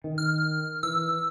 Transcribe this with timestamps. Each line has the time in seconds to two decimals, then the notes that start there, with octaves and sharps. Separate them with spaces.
0.04 D#3
0.18 F6
0.83 E3 E6